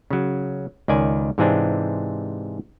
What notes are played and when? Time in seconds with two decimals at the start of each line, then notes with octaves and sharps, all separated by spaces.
0.10 C#3 F#3
0.88 C#2 D#3 D5 G#5
1.38 G#2 C3 E3 G#3 C4 D4